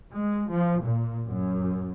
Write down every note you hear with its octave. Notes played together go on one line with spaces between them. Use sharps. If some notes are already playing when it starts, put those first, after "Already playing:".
G#3
F3
A#2
F#2